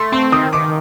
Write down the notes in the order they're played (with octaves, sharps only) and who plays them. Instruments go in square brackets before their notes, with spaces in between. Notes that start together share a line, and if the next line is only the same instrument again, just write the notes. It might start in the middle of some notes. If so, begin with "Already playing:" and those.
Already playing: [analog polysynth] A3 [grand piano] C6
[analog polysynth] C4 [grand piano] C6
[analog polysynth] D#3 [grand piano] D#6
[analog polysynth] D#3 [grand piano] D6